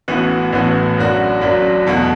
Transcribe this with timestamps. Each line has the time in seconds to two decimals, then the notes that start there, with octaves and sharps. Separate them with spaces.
0.08 A1 A2 E3 B3 F#4
0.53 A1 A2 E3 B3 F#4
0.97 F#1 F#2 F#3 D4 F#4
1.41 F#1 F#2 F#3 D4 F#4
1.86 E2 B2 A3 F#4